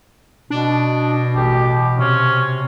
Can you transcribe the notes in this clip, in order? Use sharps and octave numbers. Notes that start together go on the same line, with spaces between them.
B2 D4
A1 G4
C3 C#4